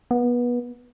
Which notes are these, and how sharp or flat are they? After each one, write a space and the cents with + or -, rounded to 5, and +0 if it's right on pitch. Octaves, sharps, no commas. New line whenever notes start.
B3 -25